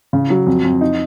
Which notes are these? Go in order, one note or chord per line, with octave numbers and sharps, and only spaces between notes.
C#3
F#3
F2
F2
D#4